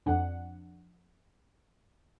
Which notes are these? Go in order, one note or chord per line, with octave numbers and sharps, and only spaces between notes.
F2 D4 F#5